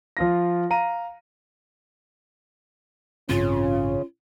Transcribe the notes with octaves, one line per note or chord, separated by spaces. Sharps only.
F3 F4 A#6
F5 A#5 D#7
A1 G2 C#3 C4 C#4 F4